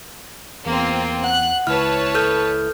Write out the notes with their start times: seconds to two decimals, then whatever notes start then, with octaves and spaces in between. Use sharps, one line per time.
0.66 E2 A#3 C4 F4
1.24 F#5 F#6
1.67 C#2 E4 B4 C#5 E5 A5 F6
2.15 A4 F6 G6